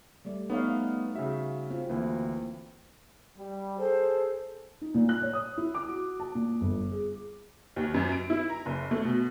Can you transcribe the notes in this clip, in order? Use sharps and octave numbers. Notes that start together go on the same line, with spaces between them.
G3 A3 D5
A3 B3 D#4 C#5 F5
C#3 F#4 E5
C4 F4
D2 E3 A#3 C4
G3
G#4 A4 C5
D#4
A#2
F#6
C#5
D#6
E4
D6
F#4
A5
A#2
G1
G#4
D#2
F#2
D7
E4
A#5
F#1
A3
B2